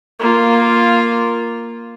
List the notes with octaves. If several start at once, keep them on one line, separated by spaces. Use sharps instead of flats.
A#3 F4